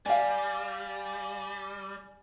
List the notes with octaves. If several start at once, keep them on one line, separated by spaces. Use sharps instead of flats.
G3 D5 F5 G#5